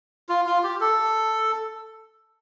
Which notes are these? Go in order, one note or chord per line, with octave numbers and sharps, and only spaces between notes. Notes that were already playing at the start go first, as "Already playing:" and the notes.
F4
F4
G4
A4